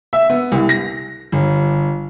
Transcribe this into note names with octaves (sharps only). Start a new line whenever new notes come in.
E5
B3
C2
A#6
G1